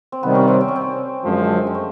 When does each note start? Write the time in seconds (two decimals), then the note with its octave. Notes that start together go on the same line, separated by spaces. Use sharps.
0.12 C4
0.22 C3 D#3 G3 B3
0.35 C#4
0.48 C4
0.61 C4
0.68 C#4
0.76 C4
1.25 F#2 D3 F3 G#3
1.67 G#3
1.75 A3